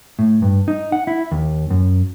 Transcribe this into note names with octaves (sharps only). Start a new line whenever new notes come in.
A2
G2
D#4
F#5
E4
D#2
F#2